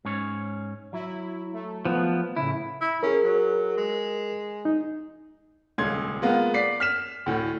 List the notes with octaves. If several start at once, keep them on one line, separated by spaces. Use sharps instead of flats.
G#2 C#4 C#5
F#3 E4
A3
F3 B3
A2 C#3 E4
E4
C#4 G#4 A#4
F#3
G#3
D#4
D#1 C#2 C6 G#6
G#3 A#3 B3 F4
D5 B6 C7
F6 B6 E7
D2 A2